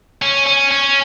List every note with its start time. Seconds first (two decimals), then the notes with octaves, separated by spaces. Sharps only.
0.22 C#4
0.47 C#4
0.72 C#4